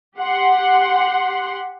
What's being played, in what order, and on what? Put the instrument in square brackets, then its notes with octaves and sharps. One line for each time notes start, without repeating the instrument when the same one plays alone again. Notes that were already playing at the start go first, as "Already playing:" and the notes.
[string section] G4 F#5 C6